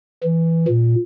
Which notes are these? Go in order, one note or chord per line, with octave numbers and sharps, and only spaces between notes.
E3
A#2